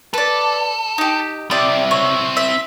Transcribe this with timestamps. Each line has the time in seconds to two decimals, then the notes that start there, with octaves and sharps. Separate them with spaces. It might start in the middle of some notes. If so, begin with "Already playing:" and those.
0.14 A4 B4 D5
0.98 D#4 G4
1.51 C4 E4 G4 D5 D#6
1.91 C#5
2.37 E5